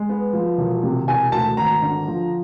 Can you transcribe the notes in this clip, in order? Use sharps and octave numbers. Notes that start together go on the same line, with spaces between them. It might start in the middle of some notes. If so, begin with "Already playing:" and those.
Already playing: G#3
B3
F3
E1
C3
E1 G#5
D2 A5
G#1 A#5
D3
F3